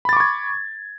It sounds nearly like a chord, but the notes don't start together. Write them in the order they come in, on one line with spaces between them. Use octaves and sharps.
B5 A6 D6 C#6 G#6